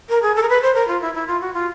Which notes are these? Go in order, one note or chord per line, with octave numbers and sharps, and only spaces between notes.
A#4
G#4
A4
A#4
B4
C5
A#4
F4
E4
E4
F4
F#4
F4